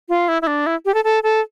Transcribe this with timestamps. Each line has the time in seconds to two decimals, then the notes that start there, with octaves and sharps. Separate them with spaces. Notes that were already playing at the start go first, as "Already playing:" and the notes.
0.09 F4
0.28 E4
0.42 E4
0.47 D4
0.66 E4
0.85 G4
0.94 A4
1.04 A4
1.23 A4